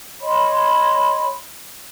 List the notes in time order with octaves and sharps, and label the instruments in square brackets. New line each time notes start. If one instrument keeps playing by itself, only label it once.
[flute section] C#5 D#5 B5 C6